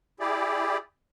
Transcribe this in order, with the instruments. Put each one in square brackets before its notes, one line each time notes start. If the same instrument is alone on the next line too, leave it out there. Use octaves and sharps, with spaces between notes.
[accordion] E4 G4 G#4 D5